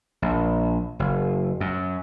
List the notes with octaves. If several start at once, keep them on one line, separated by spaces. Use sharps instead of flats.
A#1
F#1
F#2